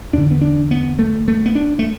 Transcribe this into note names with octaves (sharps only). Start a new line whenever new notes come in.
E2 D3 D4
B3
D4
B3
A3
A3
B3
D4
A3